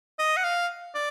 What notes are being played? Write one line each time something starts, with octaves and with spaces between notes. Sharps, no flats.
D#5
F#5
F5
D5